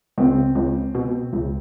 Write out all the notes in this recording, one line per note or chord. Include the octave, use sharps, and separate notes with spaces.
C#2 C4
C#2
B2
C#2